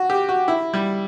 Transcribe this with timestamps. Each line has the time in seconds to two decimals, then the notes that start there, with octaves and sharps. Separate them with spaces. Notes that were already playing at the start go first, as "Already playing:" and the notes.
Already playing: F#4
0.10 G4
0.29 F#4
0.48 E4
0.74 G3